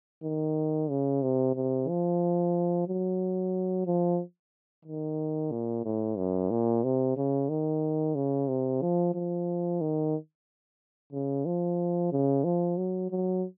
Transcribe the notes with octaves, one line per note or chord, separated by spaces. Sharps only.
D#3
C#3
C3
C3
F3
F#3
F3
D#3
A#2
A2
F#2
A#2
C3
C#3
D#3
C#3
C3
F3
F3
D#3
C#3
F3
C#3
F3
F#3
F#3